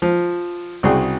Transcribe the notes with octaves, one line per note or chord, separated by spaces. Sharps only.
F3
C2 C#3 F#4 G#4 G5